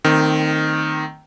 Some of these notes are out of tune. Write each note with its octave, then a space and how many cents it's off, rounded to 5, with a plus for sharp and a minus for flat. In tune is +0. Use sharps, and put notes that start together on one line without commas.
D#3 -10 A3 +40 C4 +0